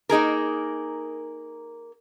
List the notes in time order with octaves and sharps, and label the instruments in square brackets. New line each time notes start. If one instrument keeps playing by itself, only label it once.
[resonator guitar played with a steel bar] A#3 D#4 G#4 A#4